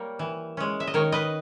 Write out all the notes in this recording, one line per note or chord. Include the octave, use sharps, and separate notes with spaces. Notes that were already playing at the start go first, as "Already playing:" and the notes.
Already playing: G3 A#3 A#4 C#5
E3
G#3 C#4
E5
D#5
D#3 A#4 C#5
B4 D#5